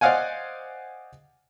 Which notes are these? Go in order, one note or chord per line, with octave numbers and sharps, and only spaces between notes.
C5 D5 D#5 F5 F#5 G#5